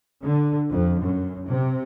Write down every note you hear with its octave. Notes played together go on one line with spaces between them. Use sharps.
D3
F2
F#2
C3